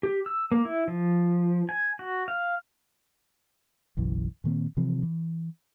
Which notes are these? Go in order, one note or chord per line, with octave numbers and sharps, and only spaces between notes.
G4
E6
A#3
E4
F3
G#5
F#4
F5
F#1 B1 F#2 E3
A#2 D#3 A#3 C4
C3 E3 F3 C4
E3